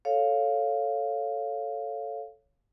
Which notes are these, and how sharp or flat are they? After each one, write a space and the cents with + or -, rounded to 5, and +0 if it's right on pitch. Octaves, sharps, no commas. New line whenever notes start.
A4 +0 C#5 +0 F5 +0